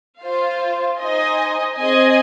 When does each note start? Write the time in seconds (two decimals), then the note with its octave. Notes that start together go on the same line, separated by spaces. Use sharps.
0.21 F4 C5 F5
0.99 D#4 C5 D#5 G#5
1.76 C4 G#4 D#5 G#5